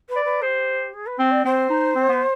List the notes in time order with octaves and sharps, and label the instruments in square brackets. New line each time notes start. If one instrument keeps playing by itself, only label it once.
[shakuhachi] B4
[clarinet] D5
[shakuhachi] B4
[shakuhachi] G4 G#4 [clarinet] C5
[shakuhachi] G#4
B4
[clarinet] C4 [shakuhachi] C5
[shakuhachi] D5
[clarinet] C4 [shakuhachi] C5
[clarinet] D#4
C4
B3